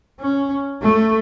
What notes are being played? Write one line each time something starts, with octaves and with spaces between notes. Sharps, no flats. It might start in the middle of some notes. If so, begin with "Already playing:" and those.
C#4
A3